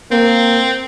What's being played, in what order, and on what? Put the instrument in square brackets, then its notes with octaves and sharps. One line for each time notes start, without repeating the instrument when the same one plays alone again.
[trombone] A#3 [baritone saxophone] C4